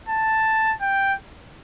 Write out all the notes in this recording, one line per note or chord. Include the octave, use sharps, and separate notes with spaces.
A5
G5